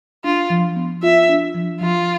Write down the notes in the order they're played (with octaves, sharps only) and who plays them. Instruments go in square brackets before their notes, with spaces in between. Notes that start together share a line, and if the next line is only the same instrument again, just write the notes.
[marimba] D4 [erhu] F4
[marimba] F3
B3
[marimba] F4 [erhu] E5
[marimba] D4
F3
[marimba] F3 [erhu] F4